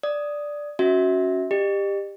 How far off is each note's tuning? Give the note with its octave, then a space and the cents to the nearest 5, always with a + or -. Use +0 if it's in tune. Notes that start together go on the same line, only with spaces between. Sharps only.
D5 +0 D#6 +0
C#4 +0 F#4 +0 E5 -25
G4 +15 D#5 -45